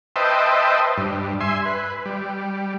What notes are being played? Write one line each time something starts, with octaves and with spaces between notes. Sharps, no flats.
B4 C5 D#5 E5 G5 A5
G2
E5 G#5 C6
B4
G3